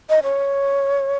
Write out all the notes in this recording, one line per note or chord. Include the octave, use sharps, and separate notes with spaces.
D#5
C#5